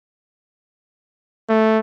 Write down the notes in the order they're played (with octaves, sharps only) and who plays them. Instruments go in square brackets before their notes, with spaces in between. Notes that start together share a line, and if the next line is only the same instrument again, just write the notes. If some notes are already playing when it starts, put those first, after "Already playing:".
[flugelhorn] A3